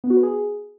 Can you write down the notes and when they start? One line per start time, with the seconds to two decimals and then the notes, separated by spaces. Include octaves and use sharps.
0.04 B3
0.10 F#4
0.17 B4
0.23 G#4